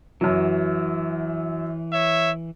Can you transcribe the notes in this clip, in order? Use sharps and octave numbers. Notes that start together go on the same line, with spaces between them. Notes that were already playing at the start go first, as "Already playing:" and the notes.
F#2 E3 F#3
C#5 E5